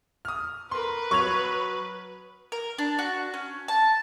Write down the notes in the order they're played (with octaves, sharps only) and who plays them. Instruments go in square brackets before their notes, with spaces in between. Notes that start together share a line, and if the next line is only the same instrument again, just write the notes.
[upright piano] D#6 F6
[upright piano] A#4 C6 [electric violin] B4
[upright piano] F#3 G#6 F7 [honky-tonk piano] C#6
[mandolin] A#4
D4
F#4
C#4
A5